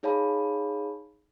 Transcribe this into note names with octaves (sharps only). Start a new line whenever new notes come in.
D#4 G#4 C#5 F5 A5 B5